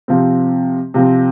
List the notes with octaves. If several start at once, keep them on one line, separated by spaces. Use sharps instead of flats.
C3 F3 C4
C3 F3 C4